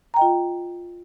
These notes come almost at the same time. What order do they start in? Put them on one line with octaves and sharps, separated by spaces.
A#5 G5 D#5 F4